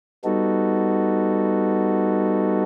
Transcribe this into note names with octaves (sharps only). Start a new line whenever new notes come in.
G3 B3 D#4 F#4 A4